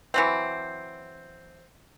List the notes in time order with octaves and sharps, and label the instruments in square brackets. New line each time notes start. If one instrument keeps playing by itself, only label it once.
[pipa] E3 F#3 C4